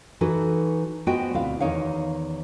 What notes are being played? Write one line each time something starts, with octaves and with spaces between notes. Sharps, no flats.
E3 D#4 F#4 A4 B4
G#3 B3 F#4 C5 D#5 G5
D2 B2 C4 E4 F5
E2 A#2 D#3 D#4 C#5 F5